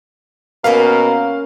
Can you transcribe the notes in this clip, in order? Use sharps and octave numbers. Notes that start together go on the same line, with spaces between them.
B2 A#3 C#4 A#4 B4 F5